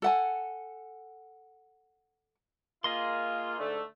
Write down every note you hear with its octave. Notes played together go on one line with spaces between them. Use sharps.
A4 F#5 G#5
A#3 F4 G#4 D#5 C6
G#2 D3 A3